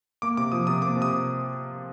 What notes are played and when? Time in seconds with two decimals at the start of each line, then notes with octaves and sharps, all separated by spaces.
0.22 A#3 D6
0.37 C3 D6
0.52 F3 D#6
0.67 C3 D#6
0.82 A#3 D6
0.97 C3
1.02 D#6